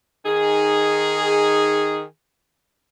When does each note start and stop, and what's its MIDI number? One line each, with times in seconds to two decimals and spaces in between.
0.26 2.04 51
0.26 2.04 63
0.26 2.04 68